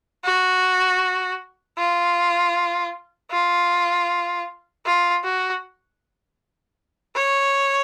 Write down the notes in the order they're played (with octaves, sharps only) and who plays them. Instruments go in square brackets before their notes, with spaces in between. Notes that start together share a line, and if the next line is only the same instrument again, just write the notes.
[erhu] F#4
F4
F4
F4
F#4
C#5